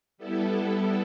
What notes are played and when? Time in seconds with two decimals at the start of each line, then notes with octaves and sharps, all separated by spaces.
0.18 G3 B3 E4 A4